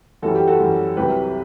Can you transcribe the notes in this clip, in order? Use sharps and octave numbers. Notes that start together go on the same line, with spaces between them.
F#2 E3 G3 F#4 A4
G4
F#4 A4
F#2 E3 G3
C2 C3 F#3 G4 B4